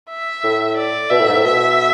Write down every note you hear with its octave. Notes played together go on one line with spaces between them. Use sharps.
E5
A2
D5
B2 E5
A2
G#2
A2
B2 E5